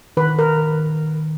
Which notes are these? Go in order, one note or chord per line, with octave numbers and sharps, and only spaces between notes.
D#3 B4
A#4